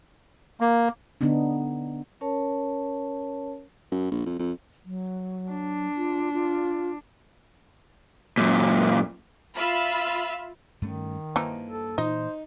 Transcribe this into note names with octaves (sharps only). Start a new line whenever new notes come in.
A#3
D3 B3 D4 D#4
C#4 A#4 C#5 A5
F#2
A#1
F2
F2
F#3
D4
F4
F4
F#2 A#2
F4 E5 F5 B5 E6
G2 D#3 A3 C#4
G2 E3 F3 A#3 D#4
A4
A#2 E3 D#4 C5 D#5